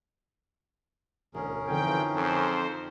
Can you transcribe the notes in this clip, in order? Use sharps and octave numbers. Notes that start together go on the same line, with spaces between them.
E1 D2 C#4 G#4 A#4
F2 D3 E3 F3 D#4 G5 G#6
F2 C5 A5 C#6